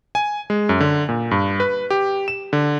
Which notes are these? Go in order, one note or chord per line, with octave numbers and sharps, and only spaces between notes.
G#5
G#3
F#2
D3
A#2
G2
B4
G4
E7
D3